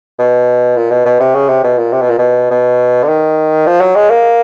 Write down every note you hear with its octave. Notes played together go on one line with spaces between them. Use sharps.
B2
A#2
B2
B2
C3
C#3
C3
B2
A#2
C3
B2
A#2
B2
B2
D3
D#3
F3
F#3
G#3
A#3